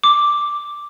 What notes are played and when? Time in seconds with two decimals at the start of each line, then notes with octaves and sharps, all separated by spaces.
0.04 D6